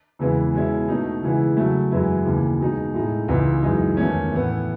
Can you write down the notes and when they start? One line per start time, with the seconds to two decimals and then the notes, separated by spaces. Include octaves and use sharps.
0.19 E2 C#3 E3 G#3 B3
0.54 B2 G#3 C#4 E4
0.88 B2 A3 D#4
1.23 C#3 E3 G#3 B3 E4
1.57 C#3 F#3 A3
1.91 F#2 E3 G#3 B3 E4
2.25 D#2 C#3 E3
2.60 B2 G#3 D#4
2.94 A2 G#3 D#4
3.28 C#2 C#3 E3 B3 D#4
3.63 F#2 E3 G#3 D#4
3.97 E2 D#3 A3 C#4
4.32 A2 E3 B3